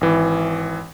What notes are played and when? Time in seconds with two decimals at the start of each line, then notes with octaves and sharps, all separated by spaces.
0.01 G#1 E3